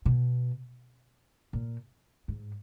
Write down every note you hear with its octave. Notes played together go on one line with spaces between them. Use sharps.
B2
A#2
G#2